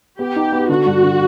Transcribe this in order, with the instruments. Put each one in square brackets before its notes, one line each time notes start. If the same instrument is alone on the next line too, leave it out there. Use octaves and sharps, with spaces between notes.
[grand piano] B3 [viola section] G4
[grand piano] D#4
B3
[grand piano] D3 [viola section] F#4
[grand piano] G2
D3